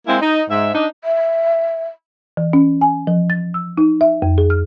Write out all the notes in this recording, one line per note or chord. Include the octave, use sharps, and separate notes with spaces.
G#3 A#3 C4 E4
D#4
G#2 E5
D4 D#4
E5
E3
C#4
G#5
F3
A6
E6
D#4
E5
F2
G#4
F6